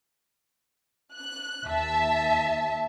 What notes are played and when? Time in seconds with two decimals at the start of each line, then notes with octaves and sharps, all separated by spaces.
1.14 F#6
1.66 D#2 E5 A5